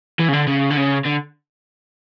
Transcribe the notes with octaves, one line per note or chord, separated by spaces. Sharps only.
E3
C#3
D3
C#3
D3
C#3
D3